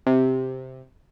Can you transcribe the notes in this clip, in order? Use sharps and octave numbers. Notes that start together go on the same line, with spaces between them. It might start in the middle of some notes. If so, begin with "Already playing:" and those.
C3